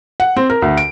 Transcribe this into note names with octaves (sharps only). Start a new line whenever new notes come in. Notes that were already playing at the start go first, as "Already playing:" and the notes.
F#5
C4
A#4
D2
D7